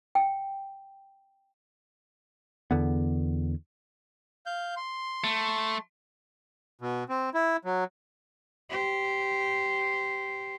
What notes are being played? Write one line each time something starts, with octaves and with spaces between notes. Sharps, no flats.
G5
E2 D3 B3
F5 G6
C6
A3
B2
C4
E4
F#3
G4 C5